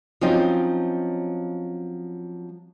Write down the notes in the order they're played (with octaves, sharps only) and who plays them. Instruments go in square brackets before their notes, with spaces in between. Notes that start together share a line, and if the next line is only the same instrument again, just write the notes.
[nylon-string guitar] F3 F#3 C4 C#4 D#4 F4